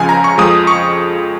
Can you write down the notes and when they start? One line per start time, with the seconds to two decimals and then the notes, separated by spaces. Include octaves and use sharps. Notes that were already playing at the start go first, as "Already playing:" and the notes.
Already playing: C#2 C#3 F3 G#5
0.09 A#5
0.24 C#6
0.38 F2 F3 G#3 D#6
0.67 C#6